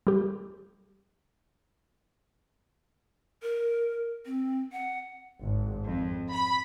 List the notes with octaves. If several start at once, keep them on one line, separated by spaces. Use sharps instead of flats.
G3 G4
A#4
C4
F#5
G#1
F2
B5